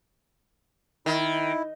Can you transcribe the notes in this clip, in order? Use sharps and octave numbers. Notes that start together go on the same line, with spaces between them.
D#3 E4